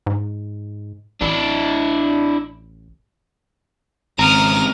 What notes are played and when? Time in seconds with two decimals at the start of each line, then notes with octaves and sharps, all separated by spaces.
0.06 G#2
1.21 A1 D4 E4
4.19 G#1 C#2 C3 A#5 D#6 F6